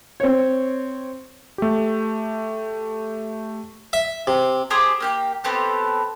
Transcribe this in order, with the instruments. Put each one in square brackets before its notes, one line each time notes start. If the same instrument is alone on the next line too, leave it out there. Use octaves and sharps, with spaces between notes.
[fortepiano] C4 C#5
[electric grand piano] A3 G4
[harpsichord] E5
C3
[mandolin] G4 G#4 C5 D#6
A#3 G4 G5
B3 C4 G4 A4